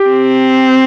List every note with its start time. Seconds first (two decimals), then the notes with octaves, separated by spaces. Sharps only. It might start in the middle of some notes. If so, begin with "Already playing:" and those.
Already playing: G4
0.09 C4